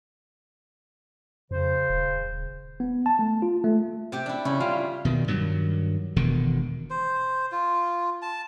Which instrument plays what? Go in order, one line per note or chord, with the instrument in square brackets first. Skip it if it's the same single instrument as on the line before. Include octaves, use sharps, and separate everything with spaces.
[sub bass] F2 [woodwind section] C#3 C5
[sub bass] D#1
[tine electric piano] B3
A5
A3
F4
A3
[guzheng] C3 G4
D4 E4
[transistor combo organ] C#3 [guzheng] E4
[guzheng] G3 [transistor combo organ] F4
[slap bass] B2 D#3
G2 D#3 F#3
E1 B2 D3 D#3
[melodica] C5
F4
A5